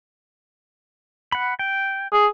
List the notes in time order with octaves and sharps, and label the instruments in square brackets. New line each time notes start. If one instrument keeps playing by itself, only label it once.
[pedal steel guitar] F#5 B5
G5
[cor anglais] G#4